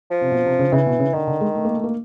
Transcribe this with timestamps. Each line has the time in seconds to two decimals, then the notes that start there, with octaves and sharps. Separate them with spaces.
0.11 F3
0.21 C3
0.31 B2
0.46 C3
0.59 C#3
0.72 C#3 E3
0.87 B2
1.00 C#3
1.14 D3 D#3
1.27 D3
1.41 G#3
1.55 A3
1.65 A#3
1.74 A3
1.84 A#3